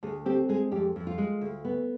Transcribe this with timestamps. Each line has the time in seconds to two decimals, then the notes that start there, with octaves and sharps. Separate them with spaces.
0.03 D2 G#4
0.26 C4 G4
0.49 G#3 G#4
0.72 F2 G4
0.96 F2
1.07 F4
1.18 G#3
1.41 D2
1.65 B3